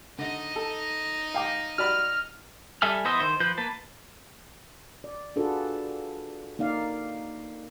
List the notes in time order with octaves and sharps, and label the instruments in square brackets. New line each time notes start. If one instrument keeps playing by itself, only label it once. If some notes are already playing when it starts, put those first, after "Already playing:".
[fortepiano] D3 [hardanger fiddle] D#4 D#5
[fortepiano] A4
F5 G5 D6
[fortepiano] F#4 D5 B5 [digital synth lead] F6
[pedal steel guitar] G3 A4 E5 G#5 F6
E3 B3 C5 D#5 E5
D#3 C5
F3 B4 G6
A#3 B4 A5
[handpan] D5
D4 F4 F#4 G#4 A4 B4
A#3 D#4 D5 F5